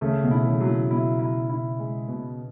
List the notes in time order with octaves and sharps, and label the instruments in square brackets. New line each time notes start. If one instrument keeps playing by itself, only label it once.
[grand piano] C#3 [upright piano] A3
[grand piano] B2
[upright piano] E4
[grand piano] C#3
[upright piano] F#3
[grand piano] E3
[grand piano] B2 [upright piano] E4
[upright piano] E4
E4
G#3
B2